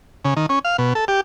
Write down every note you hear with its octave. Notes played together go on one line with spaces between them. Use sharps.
C#3
D#3
C#4
F5
B2
A4
G4